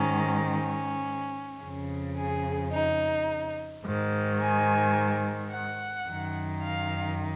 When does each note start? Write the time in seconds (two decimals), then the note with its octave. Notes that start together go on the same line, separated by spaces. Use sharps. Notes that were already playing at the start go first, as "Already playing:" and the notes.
Already playing: G#2 D#3 C#4
0.49 C#4
1.61 F2 C#3
2.16 G#4
2.72 D#4
3.84 G#2 D#3
4.40 G#5
5.52 F#5
6.08 F#2 D#3
6.64 F5